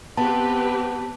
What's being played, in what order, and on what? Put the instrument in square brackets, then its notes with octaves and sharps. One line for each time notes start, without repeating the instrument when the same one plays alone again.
[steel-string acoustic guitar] B3 [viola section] C4 G4 B4 [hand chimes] A5